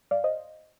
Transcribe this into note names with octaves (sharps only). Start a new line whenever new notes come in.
G2 D5 F5
C5 D#5